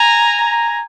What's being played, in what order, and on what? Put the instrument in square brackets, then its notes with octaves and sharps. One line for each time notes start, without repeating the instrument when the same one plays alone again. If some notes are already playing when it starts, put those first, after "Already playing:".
Already playing: [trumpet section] G#5 A#5